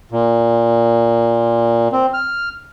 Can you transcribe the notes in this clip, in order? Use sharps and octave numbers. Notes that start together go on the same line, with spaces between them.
A#2
C4
F6